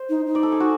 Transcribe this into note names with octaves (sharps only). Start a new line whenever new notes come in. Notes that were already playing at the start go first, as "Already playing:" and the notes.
Already playing: C5
D#4
D#4
D5
A4
G#4
F#4